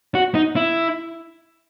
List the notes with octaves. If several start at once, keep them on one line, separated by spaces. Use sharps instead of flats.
F#4
D#4
E4